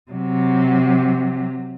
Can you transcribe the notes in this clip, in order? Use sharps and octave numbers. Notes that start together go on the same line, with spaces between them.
C3 F#3